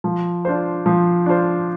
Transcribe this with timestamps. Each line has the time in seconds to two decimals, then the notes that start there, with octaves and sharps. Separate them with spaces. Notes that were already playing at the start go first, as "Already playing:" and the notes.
0.04 F3
0.45 D4 F4 C5
0.86 F3
1.26 D4 F4 C5